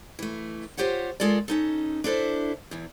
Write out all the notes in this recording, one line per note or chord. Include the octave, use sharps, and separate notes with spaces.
E3 A3
F4 G4 C5 C#5 F#5
G#3 F4 A4 A#4 D5
C#4 D#4 A4
D4 E4 A4 C5
E2 E3